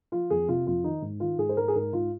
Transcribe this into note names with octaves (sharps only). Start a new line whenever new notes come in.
F3 F4
F2 G#4
C3 F4
F2 F4
D#3 D#4
G#2
D#3 F4
G#2 G#4
C5
G#2 A#4
G#4
G#2 A#4
G#2 F4